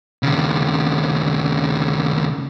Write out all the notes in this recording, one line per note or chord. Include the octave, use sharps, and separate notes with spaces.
D#2 C#3